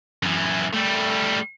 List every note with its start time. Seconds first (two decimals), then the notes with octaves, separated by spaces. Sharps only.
0.23 F#2 E3
0.73 G3 A3